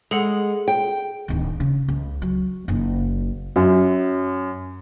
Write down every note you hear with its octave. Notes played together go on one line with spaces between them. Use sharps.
G#3 G#4 A4 F#5
G5
D1 D#3
C#3
C#2
F#3
F#1 D#4
F#2